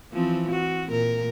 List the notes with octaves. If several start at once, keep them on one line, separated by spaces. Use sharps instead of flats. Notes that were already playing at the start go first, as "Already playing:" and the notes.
E3 F3 C4
C4 F#4
A#2 A#4